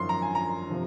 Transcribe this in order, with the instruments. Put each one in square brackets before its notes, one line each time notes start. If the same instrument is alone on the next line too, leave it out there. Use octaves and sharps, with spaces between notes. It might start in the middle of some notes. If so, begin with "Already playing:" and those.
Already playing: [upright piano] G#1 F#2 F3 C6
A#5
G#5
A#5
C3 F3